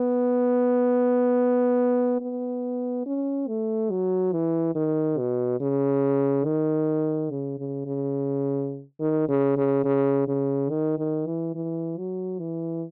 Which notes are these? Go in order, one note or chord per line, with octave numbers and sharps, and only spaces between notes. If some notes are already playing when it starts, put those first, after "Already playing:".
Already playing: B3
B3
C#4
A3
F#3
E3
D#3
B2
C#3
D#3
C#3
C#3
C#3
D#3
C#3
C#3
C#3
C#3
D#3
D#3
E3
E3
F#3
E3